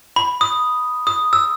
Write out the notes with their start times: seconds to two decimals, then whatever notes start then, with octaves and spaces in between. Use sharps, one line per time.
0.16 B5
0.41 D#6
1.07 D#6
1.33 E6